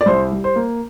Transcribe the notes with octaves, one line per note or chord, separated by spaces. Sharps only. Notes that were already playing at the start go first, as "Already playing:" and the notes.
D5
C2 C5
G3
C5
A#3